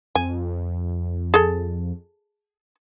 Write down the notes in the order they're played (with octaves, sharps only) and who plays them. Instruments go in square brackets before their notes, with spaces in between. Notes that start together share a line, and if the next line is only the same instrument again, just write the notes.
[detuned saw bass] F2 [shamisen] G#5
[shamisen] G#4 A4